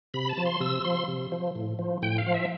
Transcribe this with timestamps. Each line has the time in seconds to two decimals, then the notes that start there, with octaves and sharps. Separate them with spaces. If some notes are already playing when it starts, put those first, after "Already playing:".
0.14 C3 B5
0.29 A5
0.37 F3
0.46 C6
0.60 C3 E6
0.84 F3 C6
1.08 C3
1.32 F3
1.55 A2
1.79 F3
2.02 A2 G5
2.18 F5
2.26 F3
2.34 E5